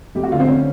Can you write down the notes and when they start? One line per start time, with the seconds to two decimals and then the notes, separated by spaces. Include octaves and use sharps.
0.15 F1 G4
0.23 F#4
0.32 D3 F4
0.40 C4
0.48 C#4